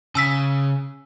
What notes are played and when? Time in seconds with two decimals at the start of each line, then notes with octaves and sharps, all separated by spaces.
0.15 C#3 G#5 E6 B6